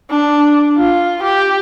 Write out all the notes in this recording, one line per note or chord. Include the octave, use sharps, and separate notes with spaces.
D4
F4
G4